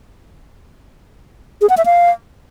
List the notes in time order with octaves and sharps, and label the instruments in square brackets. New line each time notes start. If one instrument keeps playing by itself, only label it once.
[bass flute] G#4
F#5
E5
F5